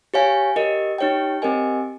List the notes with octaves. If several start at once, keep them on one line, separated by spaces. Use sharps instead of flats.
G4 C#5 F5 G#5
G4 A#4 D#5
D#4 G4 C#5 G5
C4 G4 A#4 D#5 G#5